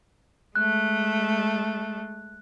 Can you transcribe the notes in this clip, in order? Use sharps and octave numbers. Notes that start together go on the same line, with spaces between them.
G#3 A3 F#6